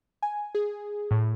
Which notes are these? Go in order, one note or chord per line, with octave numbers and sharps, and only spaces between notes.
G#5
G#4
A2